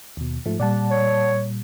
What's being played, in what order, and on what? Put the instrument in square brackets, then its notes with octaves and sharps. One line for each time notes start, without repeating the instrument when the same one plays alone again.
[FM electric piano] D#2 B2
G#2 F3 A3
[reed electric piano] A#2 G3 [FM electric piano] D5 F#5 A5
[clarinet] C#5